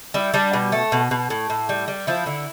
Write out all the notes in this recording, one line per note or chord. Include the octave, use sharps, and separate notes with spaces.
G3 E4
G3 D4
B2
A3
B2
B2
A2
A2
G3
G3
F3 E4
D3